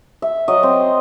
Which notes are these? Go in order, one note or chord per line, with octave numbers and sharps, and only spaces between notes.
E5
F#3 D#5
C4